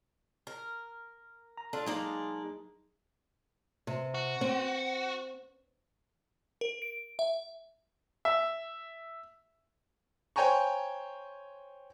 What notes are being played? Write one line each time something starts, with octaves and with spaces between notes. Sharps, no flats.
A#4
A#5
D4 F4 A4
F#3 G#3 A#3 D4 D#4
C3
F#4
C4
A#4
D7
E5
E5
C5 C#5 G5 G#5 A#5 C#6